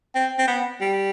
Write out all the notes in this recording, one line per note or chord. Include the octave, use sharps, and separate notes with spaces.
C4
C4
B3
G3